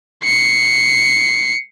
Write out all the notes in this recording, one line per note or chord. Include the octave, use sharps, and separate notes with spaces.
C7 C#7